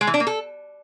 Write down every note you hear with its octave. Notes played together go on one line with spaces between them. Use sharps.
G#3
E3
D4
A#3
A4